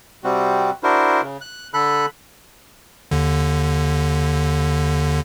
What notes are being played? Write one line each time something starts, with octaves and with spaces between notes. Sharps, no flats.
C3 G3 C4 F#4
D4 E4 F#4 A#4 C5
C#3
F#6
D3 A4 B5 F#6
D#2 D3